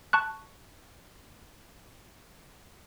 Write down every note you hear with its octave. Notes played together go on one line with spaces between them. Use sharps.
A5 C#6 F#6